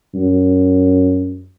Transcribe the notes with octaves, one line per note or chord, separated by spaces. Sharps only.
F#2